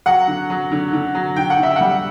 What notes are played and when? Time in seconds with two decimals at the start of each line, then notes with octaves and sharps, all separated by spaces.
0.06 F#3 F#5
0.28 D3
0.50 F#3
0.71 D3
0.93 D3
1.15 F#3
1.36 D3 G5
1.50 F#5
1.58 D3 E5
1.76 G3 F#5